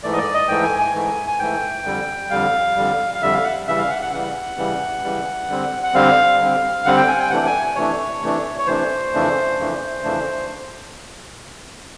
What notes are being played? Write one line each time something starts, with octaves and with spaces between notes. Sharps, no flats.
G#2 E3 A3 D5
D#5
D5
D#5
G#2 E3 A3 G5
G#5
G#5
G#2 E3 A3
G#5
G#2 E3 A3 G5
F2 D3 G3
F2 D3 G3 F5
F2 D3 G3
F5
F2 D3 G3 E5
F5
F#5
C#3 E3 G3 E5
F5
F#5
F#5
C#3 E3 G3 F#5
C#3 E3 G3
C#3 E3 G3
D3 G3 C4
F#5
D3 G3 C4 F5
D3 G3 C4
D3 G3 C4 F#5
G5
G#5
G5
C3 E3 A3 D4 F#5
G#5
C3 E3 A3 D4 C#5
C3 E3 A3 D4
C#5
C3 E3 A3 D4 C5
F2 C#3 E3 A3 D4
F2 C#3 E3 A3 D4
F2 C#3 E3 A3 D4